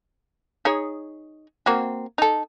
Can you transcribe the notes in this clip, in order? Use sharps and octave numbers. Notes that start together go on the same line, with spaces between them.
D#4 G#4 C#5
A#3 C4 F#4
D#4 A4